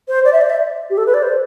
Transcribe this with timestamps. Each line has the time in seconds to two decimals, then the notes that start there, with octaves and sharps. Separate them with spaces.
0.08 C5
0.25 D5
0.33 E5
0.41 D5
0.50 E5
0.90 G4
0.98 A4
1.06 B4
1.14 D5
1.22 C5